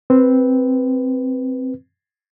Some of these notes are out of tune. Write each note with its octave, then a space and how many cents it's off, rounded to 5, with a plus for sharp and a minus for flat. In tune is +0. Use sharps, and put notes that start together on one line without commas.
C4 +0 B4 +0